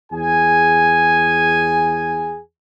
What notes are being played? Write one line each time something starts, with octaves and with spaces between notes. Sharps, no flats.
E2 G#4 G#5